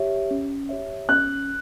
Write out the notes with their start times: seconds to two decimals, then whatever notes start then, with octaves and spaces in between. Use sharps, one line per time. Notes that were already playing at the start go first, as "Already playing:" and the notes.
Already playing: G4 C#5 E5
0.31 C#4
0.69 G4 C#5 E5
1.09 C#4 F#6